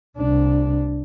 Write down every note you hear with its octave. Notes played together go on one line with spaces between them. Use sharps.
C2 D4